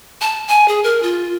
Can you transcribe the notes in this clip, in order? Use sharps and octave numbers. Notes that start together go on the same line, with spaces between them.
A5
G#5
G#4
A#4
F4